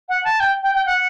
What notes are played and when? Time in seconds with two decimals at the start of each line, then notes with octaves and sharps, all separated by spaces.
0.09 F#5
0.24 A5
0.40 G5
0.63 G5
0.75 G5
0.86 F#5